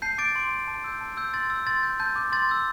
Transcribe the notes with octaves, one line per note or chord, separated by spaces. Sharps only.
A5 G6 C7
D6 G6 A6 D7
C6
G6
A5
E6 G6
A5
E6 G6
C6 A6
E6 G6
C6 A6
G6
A5 G6
D6 G6
C6 A6
E6 G6